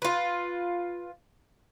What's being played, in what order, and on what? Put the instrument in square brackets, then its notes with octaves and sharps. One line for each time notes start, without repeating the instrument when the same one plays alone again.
[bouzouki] F4 B4